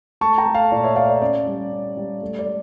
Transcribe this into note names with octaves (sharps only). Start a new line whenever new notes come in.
A3 A5 C#6
G5 A#5
A3
F5 A5
A#2 D5
C#5 E5
A3 D5 F5
D5
C#4 D5
G3
C#4
G3
A3
D5
A3